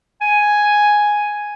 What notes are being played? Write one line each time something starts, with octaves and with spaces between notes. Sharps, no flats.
G#5